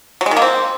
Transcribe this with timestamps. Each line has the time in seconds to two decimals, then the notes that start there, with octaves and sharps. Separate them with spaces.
0.21 F#3
0.26 G#3
0.31 D#3
0.37 A#3
0.42 C4